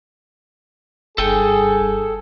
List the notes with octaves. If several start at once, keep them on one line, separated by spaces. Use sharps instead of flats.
F#1 G2 G#4 A4 G5